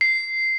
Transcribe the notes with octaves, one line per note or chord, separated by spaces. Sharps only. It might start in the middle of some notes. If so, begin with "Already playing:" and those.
C7